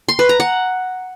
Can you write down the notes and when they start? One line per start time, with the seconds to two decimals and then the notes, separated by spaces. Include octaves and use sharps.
0.09 C6
0.19 B4
0.29 A#5
0.40 F#5